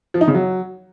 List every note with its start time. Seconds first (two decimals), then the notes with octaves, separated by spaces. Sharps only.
0.14 F3
0.21 D#4
0.28 C#3
0.34 F#3